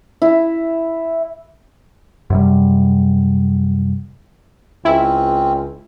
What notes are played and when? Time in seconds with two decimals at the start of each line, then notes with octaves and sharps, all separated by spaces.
0.22 E4
2.30 F#2 C3 G3
4.85 C#2 C4 C#4 E4